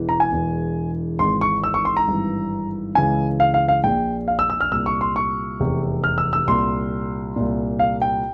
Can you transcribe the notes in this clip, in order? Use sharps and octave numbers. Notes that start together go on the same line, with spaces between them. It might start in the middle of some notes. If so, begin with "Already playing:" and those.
Already playing: E1 E2 E3
A#5
G#5
E1 E2 E3
G#1 G#2 E3 C6
C#6
E6
C#6
C6
A#5
G#1 G2 E3
C#2 C#3 E3 G#5
F5
F5
F5
A#1 A#2 G5
F5
E6
E6
F6
C2 A#2 E6
C#6
C6
C#6
F1 E2 C3
F6
E6
E6
C2 A#2 C6
C2 A#2
F5
G5